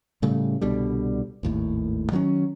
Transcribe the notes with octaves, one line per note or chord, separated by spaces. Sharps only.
A2 C#3 G3 A3
C2 B2 D3 G3
G#1 D#2 A2
D#3 F#3 C4 C#4